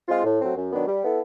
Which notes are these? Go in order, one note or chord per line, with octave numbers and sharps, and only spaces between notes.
G#3 C4 F4
A2
F#3 A3 C4
F#2
D#3 F#3 B3 D4
G3
B3 E4 A4